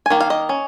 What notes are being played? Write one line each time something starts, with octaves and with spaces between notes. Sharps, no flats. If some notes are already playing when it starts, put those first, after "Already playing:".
G#5
D#3 A#3
F5
D#5
C#4